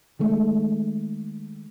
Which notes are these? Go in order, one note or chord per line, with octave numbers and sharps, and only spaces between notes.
D#3 G#3 A3